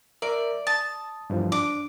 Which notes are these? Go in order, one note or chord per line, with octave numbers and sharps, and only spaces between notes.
A#4 D5 E5
A5 D#6
G2 E3 F3
D4 D6